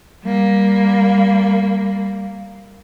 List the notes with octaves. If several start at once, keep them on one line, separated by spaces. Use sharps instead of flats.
G3 A#3